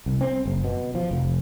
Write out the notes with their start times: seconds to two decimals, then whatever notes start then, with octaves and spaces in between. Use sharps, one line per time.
0.06 C2
0.21 C4
0.45 F#1
0.64 B2
0.95 F3
1.11 F1